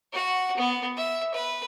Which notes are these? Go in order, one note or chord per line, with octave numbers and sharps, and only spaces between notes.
F#4 F#5
B3
E5
B4